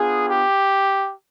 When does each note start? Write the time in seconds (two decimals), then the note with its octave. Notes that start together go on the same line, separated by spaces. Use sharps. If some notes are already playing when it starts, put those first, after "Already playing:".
Already playing: B3 D4 F4 G#4
0.28 G4